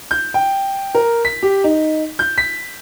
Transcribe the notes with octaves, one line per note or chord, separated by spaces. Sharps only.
G6
G5
A#4
B6
G4
D#4
G6
B6